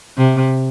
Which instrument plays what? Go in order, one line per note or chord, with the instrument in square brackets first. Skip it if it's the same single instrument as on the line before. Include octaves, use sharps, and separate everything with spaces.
[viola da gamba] C3